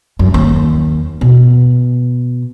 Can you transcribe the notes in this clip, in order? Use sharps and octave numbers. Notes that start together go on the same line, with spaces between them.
F#2
D#2
B2